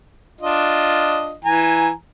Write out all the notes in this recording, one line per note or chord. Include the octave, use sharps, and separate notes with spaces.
D4 F4 D#5
E3 G#5 A#5